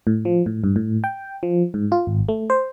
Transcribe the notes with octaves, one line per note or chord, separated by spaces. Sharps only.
A2
F3
A2
G2
A2
G5
F3
G#2
F4
G#1
A3
C5